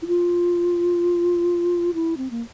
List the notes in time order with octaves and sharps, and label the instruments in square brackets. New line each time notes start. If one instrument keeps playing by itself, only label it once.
[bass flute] E4
F4
E4
C4
A#3